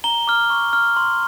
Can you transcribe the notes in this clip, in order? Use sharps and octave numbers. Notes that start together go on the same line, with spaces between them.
A#5 G7
D6 F6
C#6
F6
C6